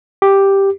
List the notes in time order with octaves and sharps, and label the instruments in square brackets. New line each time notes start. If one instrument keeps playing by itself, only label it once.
[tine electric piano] G4